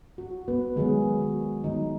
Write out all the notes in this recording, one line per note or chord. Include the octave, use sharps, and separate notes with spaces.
F#4
B3 B4
D#3 F#3 G#3 B3 G#4
F#4
D#3 F#3 B3 D#4